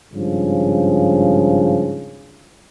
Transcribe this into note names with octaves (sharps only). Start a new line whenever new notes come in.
G#1 G2 C#3 F3